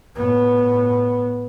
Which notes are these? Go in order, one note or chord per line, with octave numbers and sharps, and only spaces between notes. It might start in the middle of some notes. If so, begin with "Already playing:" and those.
A2 B3